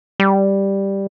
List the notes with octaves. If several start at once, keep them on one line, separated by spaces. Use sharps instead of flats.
G3